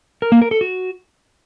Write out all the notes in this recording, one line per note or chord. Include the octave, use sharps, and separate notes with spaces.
A#4
A#3
A#4
A4
F#4